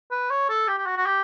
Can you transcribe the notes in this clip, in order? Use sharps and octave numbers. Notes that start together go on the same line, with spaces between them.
B4
C#5
A4
G4
G4
F#4
F#4
G4